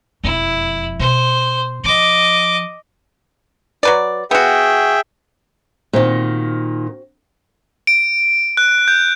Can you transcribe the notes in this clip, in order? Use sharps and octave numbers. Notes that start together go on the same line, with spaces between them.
E1 F2 E4
B2 C5
F3 D#5 D6
F#3 B4 D5
B3 F#4 G#4 E5 G5
A#2 D#3 C4 F#4 C5
D7
F#6
G6